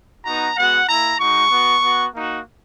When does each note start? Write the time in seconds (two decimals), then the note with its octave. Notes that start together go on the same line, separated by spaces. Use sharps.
0.25 B3 D#4 F#4 A#5
0.56 G#3 B3 F#4 F#5
0.88 A#3 E4 A#5
1.20 G#3 D#4 F#4 C#6
1.51 B3 F#4
1.83 B3 F#4
2.14 A#3 D#4 F#4